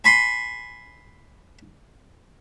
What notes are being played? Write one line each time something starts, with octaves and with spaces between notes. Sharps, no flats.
G#5 B5 C6